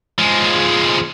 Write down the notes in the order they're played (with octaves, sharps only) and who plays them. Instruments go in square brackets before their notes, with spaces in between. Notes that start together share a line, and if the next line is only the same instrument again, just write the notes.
[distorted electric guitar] F3 G#3